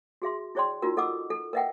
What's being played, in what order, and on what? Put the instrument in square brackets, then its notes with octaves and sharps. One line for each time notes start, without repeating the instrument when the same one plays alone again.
[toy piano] F#4 G#4 E5 C6
E4 G#4 C#5 D5 G5 C6
D#4 F4 F#4 A#4
A4 D#5 F#5 D6 E6
A4
A#4 B4 D#5 E5 F#5 G5